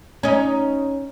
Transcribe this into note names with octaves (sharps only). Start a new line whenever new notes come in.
C#4 D#4